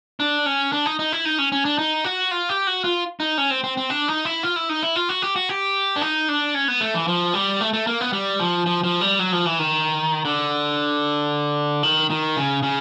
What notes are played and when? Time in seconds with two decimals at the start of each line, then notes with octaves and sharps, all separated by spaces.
0.20 D4
0.46 C#4
0.72 D4
0.86 D#4
0.99 D#4
1.12 E4
1.25 D#4
1.38 C#4
1.52 C#4
1.65 D4
1.79 D#4
2.04 F#4
2.31 F4
2.49 G4
2.67 F#4
2.84 F4
3.20 D#4
3.38 C#4
3.50 C4
3.64 C4
3.77 C4
3.90 D4
4.08 D#4
4.25 E4
4.43 F4
4.56 E4
4.69 D#4
4.83 E4
4.96 F4
5.09 F#4
5.22 G4
5.36 F#4
5.49 G4
5.96 D4
6.01 D#4
6.28 D4
6.54 C#4
6.68 B3
6.81 A3
6.94 E3
7.08 F3
7.34 G3
7.61 A3
7.73 A3
7.87 A#3
8.01 B3
8.13 G3
8.40 F3
8.66 F3
8.84 F3
9.01 G3
9.19 F#3
9.32 F3
9.46 E3
9.59 D#3
10.25 D3
11.83 D#3
12.10 D#3
12.37 C#3
12.63 C#3